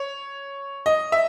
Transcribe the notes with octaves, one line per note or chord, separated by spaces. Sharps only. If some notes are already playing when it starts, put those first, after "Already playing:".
Already playing: C#5
D#5
E5